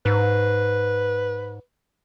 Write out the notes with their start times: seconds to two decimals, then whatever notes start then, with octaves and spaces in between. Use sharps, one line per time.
0.06 G#2 B4